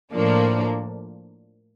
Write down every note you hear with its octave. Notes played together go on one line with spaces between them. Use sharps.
A2 F3 A#3 D4